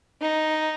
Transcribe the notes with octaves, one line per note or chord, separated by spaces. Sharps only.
D#4